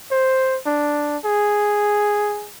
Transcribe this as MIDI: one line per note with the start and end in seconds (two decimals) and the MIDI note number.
0.12 0.58 72
0.66 1.17 62
1.25 2.50 68